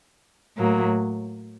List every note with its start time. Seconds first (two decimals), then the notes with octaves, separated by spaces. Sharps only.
0.56 A2 F#3 A#3